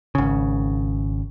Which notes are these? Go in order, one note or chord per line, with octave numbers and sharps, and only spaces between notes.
G#1 C#3